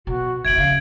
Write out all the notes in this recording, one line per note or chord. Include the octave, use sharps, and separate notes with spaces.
B2 F#4
E2 A#2 E5 G#6 D7 F#7
C#3 F5